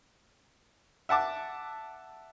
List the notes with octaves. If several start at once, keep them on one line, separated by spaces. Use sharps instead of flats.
E5 F#5 A5 D6